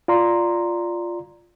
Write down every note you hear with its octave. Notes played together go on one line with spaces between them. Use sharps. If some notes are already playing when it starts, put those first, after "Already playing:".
F4 D5 A#5 C6